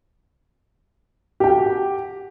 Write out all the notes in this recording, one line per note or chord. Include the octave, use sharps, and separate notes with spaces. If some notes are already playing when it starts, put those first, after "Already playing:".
F#4 G4 G5